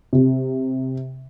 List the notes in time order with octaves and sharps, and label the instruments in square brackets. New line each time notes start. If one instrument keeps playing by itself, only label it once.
[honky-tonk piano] C3